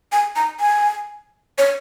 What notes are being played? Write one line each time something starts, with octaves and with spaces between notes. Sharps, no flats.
G#5
A#5
G#5
C#5